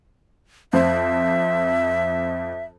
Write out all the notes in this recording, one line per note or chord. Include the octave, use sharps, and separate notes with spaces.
F2 C5 E5